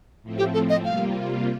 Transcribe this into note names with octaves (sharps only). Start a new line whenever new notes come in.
A2 F3 A3 C4
G4
A4
D#5
C3 G3 A#3 F4 F5